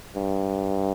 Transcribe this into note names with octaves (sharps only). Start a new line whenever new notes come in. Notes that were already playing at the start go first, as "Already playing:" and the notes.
G2